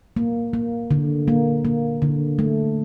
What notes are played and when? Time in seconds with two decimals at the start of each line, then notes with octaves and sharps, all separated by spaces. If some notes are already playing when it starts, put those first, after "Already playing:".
0.17 A#3
0.53 A#3
0.91 D3
1.28 A#3
1.65 A#3
2.02 D3
2.39 A3